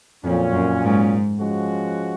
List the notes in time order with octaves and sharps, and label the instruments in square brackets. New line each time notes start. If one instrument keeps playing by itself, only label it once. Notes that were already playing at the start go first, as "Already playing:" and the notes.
[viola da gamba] F2 [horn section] A#2 F#3 C#4
[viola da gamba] F#2
G#2
[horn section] F3 G#3 C#4 F#4